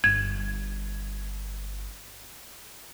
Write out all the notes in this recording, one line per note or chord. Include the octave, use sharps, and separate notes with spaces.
G1 G#6